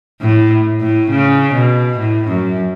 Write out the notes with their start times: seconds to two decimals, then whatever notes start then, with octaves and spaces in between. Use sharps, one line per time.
0.21 A2
0.80 A2
1.10 C#3
1.54 B2
1.98 A2
2.27 F#2